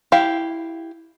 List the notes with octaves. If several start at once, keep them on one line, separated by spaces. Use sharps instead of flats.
E4 G4 F5